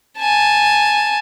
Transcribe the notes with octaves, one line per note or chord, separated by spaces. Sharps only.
G#5 A5